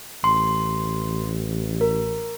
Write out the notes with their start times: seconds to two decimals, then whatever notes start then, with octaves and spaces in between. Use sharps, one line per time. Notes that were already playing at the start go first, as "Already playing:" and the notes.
0.24 A1 C6
1.81 A#4